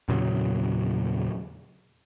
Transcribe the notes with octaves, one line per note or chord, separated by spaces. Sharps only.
E2 A#2 C#3 F#3